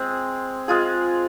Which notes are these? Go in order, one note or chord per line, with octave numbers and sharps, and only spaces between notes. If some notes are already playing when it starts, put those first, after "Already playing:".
Already playing: G#3 C4 G#4
G#3 F4 G#4